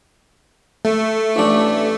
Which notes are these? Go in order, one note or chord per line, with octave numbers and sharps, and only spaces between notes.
A3
A1 D4